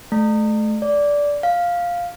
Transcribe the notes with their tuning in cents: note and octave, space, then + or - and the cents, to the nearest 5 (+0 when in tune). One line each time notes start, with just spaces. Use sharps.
A3 -30
D5 -15
F5 +5